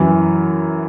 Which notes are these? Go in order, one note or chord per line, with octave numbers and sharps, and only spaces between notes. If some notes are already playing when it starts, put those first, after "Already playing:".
Already playing: F#2 E3